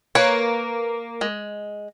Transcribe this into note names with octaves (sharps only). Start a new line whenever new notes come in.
A#3 B4 C#5
G#3